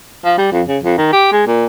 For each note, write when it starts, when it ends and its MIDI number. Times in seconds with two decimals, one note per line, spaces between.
0.24 0.34 53
0.38 0.48 55
0.52 0.62 41
0.68 0.78 49
0.83 0.96 41
0.98 1.09 51
1.12 1.29 67
1.32 1.42 56
1.47 1.66 46